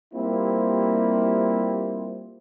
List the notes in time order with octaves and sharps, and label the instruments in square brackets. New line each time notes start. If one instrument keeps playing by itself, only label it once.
[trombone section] G3 A#3 C4 E4 F4 G4